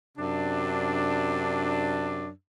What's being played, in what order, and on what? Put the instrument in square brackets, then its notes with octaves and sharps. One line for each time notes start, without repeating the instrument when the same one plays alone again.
[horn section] F#2 C3 D4